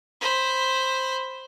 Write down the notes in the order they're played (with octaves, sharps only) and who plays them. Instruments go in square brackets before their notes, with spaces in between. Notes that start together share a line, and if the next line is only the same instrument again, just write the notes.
[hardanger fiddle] C5 B5